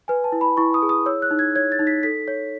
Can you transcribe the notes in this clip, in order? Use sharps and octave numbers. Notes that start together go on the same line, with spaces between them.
B4 G#5
A5
E4
B5
E4 C#6
D#6
G#4
D#6
C#5 E6
F#6
D#4
G#6
C#5 G#6
A6
D#4
B6
A4 B6
C#5